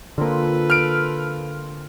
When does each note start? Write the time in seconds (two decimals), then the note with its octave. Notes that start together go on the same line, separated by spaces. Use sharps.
0.18 D3 F3 A#3 C4 F4 A4 B4
0.70 F6 D7